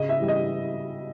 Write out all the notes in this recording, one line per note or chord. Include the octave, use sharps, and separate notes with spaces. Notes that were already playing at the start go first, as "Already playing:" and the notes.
Already playing: C#3 D#5
E5
E3 G3
D#5